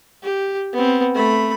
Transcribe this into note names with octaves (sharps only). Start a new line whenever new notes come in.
G4
B3 C4
A3 B5